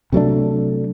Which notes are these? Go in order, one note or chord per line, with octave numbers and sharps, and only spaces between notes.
C3 F#3 A3 D4